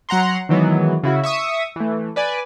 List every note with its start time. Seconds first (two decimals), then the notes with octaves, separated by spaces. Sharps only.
0.09 F#3 F#5 A#5 C6
0.49 D#3 E3 F#3 G#3 B3
1.03 C#3 E4 F#4
1.24 E5 C#6 D#6
1.76 E3 A3
2.16 B4 D5 G#5